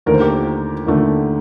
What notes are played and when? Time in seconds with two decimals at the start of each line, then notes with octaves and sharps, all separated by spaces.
0.06 D#2 D3 A3 A#4
0.14 C5
0.20 G4 A#4
0.87 D#2 D3 A3